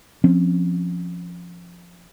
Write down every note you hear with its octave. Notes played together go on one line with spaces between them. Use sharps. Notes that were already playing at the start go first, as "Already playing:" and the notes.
F3 C4 C#4